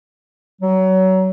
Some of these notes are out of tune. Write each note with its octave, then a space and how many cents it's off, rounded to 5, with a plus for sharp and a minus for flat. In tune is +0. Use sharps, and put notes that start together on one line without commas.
F#3 +25